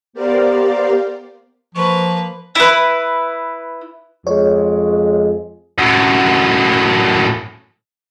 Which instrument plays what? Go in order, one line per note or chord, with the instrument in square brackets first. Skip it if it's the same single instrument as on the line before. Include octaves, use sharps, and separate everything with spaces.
[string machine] B3 G4 A#4 C5 D5 F5
[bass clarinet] F3 [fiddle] A#3 B4 [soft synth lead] C#6
[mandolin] E4 B4
[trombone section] F2 G#3 [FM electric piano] C#5
[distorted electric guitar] F#2 A2